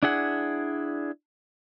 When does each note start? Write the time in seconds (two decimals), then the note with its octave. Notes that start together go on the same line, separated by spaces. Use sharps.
0.03 D4 E4 G#4 F#5